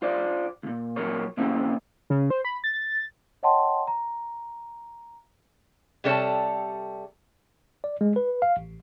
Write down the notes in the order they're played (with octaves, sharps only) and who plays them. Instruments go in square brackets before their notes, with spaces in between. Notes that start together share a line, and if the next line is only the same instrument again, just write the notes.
[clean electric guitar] F4 C5 D5
C#2 A#2
A#2 F#3 A#4 C#5
C3 A#3 C4 C#4 E4
[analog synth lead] C#3
C5
B5
A6
[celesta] C#5 D#5 F#5 G5 A5 C6
A#5
[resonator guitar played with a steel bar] C3 G3 A4 C#5 A5
[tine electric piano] D5
G#3
B4
F5
A1